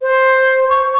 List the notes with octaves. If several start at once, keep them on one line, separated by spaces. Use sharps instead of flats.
C5
C#6